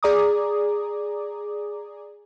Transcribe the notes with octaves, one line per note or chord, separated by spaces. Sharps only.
G#4 D5 A#5 D6 D#6